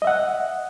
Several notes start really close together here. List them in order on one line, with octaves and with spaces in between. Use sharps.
D#5 E5 F#5